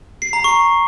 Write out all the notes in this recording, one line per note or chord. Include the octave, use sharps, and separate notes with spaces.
C7
A#5
C#6